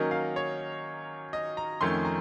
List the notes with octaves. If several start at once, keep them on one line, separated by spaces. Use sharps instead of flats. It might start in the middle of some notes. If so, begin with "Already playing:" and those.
Already playing: D#3 F#3 A#3 C#4 D#5
F5
C#5
D#5
A#5
F2 D#3 A3 C#4 C6
A#5